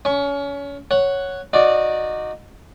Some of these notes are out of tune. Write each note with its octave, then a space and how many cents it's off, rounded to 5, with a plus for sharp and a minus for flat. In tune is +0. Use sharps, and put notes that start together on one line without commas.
C#4 +30 C#6 +0
C#5 +0 F#5 +0
D#4 -10 F#4 -20 D5 +0